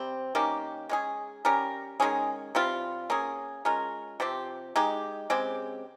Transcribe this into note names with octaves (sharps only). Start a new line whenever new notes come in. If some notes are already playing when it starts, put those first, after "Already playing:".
Already playing: C3 G3 C4
D#3 A#3 C#4 G4
G#3 C#4 G#4
G3 C#4 G4 A#4
D#3 G#3 C#4 G#4
C3 G3 C4 F4
A#3 C#4 G#4
G#3 C#4 F4 A#4
C3 F3 C4 G4
G#3 D#4 G4
C#3 G#3 C4 G4